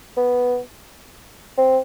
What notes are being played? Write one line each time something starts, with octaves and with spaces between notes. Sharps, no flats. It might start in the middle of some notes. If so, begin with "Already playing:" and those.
B3
C4